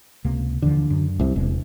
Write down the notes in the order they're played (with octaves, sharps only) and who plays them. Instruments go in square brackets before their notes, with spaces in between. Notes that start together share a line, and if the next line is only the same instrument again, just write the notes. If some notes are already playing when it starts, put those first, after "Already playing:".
[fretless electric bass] C#2 C3 A#3
[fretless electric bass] D#2 E3 F3 [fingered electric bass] D3
[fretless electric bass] F#2
[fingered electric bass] C2 C3
[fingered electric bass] E1 [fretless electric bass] C3 G#3